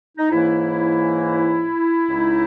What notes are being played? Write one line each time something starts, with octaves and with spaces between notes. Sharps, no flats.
D#4
G#2 E3 A#3 C#4 E4
C#2 C#3 G#3 D#4